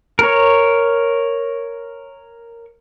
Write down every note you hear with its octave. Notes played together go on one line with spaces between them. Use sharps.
A#4 C#5